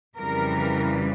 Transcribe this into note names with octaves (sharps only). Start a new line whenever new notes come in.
F2 C#3 E3 G3 A#4